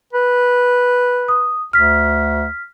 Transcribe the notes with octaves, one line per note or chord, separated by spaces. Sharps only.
B4
D#6
D2 F6 B6